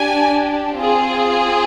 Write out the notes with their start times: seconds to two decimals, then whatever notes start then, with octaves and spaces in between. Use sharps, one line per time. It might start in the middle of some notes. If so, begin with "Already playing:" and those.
Already playing: D4 G4 G#5
0.77 C4 F4 G#4